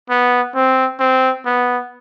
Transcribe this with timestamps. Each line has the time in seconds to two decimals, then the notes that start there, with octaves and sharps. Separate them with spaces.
0.10 B3
0.55 C4
1.00 C4
1.46 B3